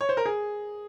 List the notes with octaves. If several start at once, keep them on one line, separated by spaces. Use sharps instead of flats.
C#5
C5
A#4
G#4